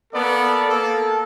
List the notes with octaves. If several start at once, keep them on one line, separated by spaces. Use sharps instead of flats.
A#3 B3 A4 D5
A#3 A4